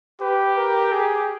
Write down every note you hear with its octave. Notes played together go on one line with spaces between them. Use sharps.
G4 B4
A#4
G#4